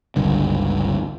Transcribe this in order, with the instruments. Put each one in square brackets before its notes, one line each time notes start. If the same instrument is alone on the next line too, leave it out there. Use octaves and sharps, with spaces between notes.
[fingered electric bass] G1 C#2 G2 D3